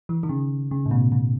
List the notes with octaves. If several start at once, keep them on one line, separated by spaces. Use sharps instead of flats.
E3
D#3
C#3
C#3
A2
B2
B2